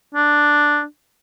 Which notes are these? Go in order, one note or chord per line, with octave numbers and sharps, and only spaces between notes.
D4